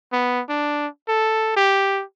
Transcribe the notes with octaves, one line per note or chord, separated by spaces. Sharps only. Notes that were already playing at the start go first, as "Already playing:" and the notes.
B3
D4
A4
G4